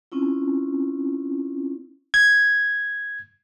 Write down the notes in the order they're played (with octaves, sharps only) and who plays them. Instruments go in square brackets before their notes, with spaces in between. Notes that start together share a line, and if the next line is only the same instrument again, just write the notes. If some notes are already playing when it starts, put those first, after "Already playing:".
[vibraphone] C4 C#4 E4 F4
[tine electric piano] G#6